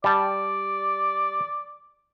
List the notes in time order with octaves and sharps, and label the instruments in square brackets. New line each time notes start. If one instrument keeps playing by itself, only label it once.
[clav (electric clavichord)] G3 A5 [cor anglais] D5